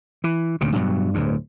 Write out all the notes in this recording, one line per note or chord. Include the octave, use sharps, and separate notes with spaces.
E3
D2 A#2 C#3
G2 B2 F#3
D1 D2 G2